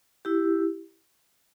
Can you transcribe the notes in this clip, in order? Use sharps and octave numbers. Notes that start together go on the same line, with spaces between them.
E4 G4